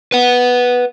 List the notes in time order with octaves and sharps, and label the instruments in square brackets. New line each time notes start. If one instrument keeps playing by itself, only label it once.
[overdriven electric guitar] B4 F#5